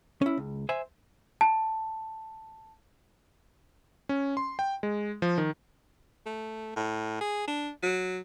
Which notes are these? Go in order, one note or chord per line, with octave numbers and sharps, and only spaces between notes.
C#4 E4
C#2
C5 E5 G#5
A5
C#4
C6
G5
G#3
F3
D#3
A3
A2
G#4
D4
F#3